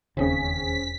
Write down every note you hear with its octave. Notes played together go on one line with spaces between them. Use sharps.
E1 D#2 C#3 C4 C#4 G#4 B6